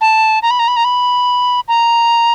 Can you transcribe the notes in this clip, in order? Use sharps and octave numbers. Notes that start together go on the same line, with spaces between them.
A5
A#5
B5
A#5
B5
A#5
B5
A#5